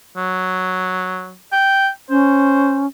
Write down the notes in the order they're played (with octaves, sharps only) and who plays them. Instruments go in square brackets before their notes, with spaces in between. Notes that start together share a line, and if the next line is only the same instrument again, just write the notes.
[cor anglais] F#3
G5
[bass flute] C#4 [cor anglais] C5